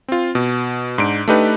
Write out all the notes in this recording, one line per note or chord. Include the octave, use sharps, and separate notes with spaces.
C4 F4
B2
G#2 D4 D7
A3 D4 D#4 G4 B4